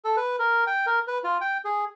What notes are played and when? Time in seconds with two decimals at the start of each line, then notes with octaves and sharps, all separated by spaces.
0.05 A4
0.17 B4
0.39 A#4
0.67 G5
0.86 A#4
1.08 B4
1.24 F4
1.41 G5
1.65 G#4